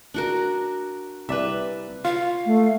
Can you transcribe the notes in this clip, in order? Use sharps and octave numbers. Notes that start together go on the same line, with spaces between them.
D4 F#4 A#4
C2 B4 D5 E5
F4 C#5 F5
A3